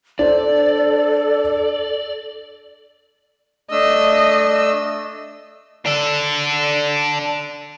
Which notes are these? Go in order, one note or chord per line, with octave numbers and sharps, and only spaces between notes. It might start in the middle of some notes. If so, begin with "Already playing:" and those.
D4 A4 C5 D5
A3 D4 D#5 E6
D4 A4